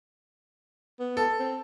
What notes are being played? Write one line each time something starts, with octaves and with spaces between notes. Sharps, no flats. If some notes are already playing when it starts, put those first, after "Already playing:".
B3
A4
C4